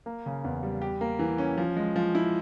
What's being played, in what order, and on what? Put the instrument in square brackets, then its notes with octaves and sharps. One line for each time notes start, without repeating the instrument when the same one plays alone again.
[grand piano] A#3
C#3
E2
G3
G4
A#3
E3
C#4
F3
G#3
F3
E4